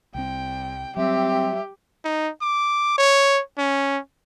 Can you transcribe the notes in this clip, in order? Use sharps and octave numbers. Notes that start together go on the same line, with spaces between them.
C2 G3 C4 G5
F#3 G3 C4 G4 E5
D#4
D6
C#5
C#4